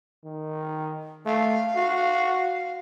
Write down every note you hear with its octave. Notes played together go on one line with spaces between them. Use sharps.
D#3
A3 F5
F#4